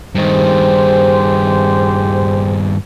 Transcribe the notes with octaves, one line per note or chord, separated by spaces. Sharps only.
G2 D#3 G4 G#4 C5